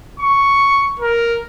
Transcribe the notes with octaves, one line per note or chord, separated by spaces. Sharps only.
C#6
A#4